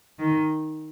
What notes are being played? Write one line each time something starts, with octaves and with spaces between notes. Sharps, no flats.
D#3